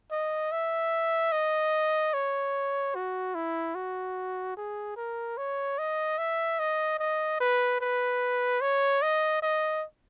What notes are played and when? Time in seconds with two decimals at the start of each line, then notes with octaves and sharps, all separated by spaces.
0.11 D#5
0.52 E5
1.32 D#5
2.14 C#5
2.95 F#4
3.35 E4
3.75 F#4
4.57 G#4
4.97 A#4
5.37 C#5
5.79 D#5
6.18 E5
6.59 D#5
6.99 D#5
7.40 B4
7.81 B4
8.61 C#5
9.02 D#5
9.42 D#5